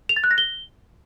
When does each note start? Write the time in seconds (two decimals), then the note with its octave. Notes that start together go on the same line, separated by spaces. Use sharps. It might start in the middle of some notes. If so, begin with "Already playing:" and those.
0.09 F7
0.16 A6
0.24 F#6
0.31 A#6
0.38 G7